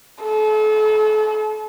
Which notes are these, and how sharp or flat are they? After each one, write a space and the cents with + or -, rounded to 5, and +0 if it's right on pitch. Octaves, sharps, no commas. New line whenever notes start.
A4 -40